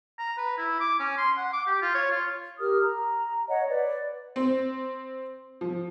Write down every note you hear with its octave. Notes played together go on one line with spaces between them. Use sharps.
A#5
B4
E4
D6
C#4
C6
F#5
D6
G4
F4
C#5
F4
G4 A#4 D#6 F6
A#5
C#5 D#5 F#5
B4 D5
C4
F3